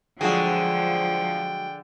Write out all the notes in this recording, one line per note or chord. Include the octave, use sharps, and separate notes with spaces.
D3 F3 F#3 G#3 F#4 G#4 G5